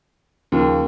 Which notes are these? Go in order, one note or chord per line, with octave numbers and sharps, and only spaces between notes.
D#2 C#3 F3